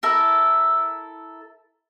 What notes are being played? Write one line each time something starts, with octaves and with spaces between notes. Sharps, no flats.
E4 A4 A#4